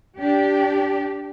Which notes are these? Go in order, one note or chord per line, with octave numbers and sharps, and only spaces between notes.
D4 G4